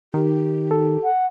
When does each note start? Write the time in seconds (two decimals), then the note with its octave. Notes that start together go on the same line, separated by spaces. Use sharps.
0.14 D#3 G4
0.71 A4
1.04 F#5